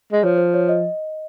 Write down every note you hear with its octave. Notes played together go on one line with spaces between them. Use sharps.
G#3
F3 C#5
C5
C#5
D#5